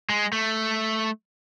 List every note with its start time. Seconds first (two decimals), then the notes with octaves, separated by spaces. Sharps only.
0.09 G#3
0.33 A3